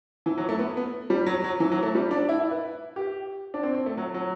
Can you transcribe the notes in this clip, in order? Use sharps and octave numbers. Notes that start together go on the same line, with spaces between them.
E3
F#3
A3
B3
B3
G3
F#3
F#3
E3
F#3
A3
G3
D4
E4
E4
B4
G4
D4
C4
C4
A3
F#3
F#3